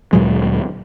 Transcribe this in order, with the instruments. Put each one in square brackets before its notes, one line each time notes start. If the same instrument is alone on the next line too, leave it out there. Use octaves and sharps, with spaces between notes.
[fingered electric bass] D2 A#2 F#3 G#3